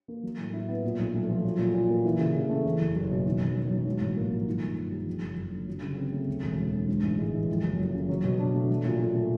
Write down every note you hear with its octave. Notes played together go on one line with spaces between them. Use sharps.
A#3
F#3
A2
E4
B3
A#2
B1
A3
F3
F#3
A#2
A#2
A#3
E3
C#3
C#3
A3
E2
F#1
F#1
B2
D#3
F#2
F#2
F#3
G#2
A1
A#3
F3
D#3
G2
G2
G3
F2
F#1
F#1
D3
F#3
C#3
C4
A3
D2
E1
F#3
D3
G#2
A1
G#3
E3
F2
F#1
F#3
C#3
F#3
B2
D4
A3
F#3
A#2
A#2
A3